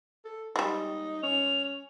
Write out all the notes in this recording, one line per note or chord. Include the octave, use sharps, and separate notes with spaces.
A4
G3 G#3 D#4
C#4 F7